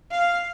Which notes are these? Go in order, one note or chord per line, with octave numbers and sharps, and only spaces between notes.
F5